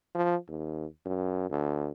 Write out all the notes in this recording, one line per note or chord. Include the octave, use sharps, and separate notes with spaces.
F3
D#2
F#2
D2